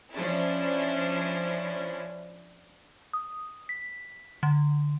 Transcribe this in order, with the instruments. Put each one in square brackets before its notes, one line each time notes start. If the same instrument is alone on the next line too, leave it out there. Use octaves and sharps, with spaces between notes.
[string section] F3 C#4 D4 E4
[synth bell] D#6
B6
D3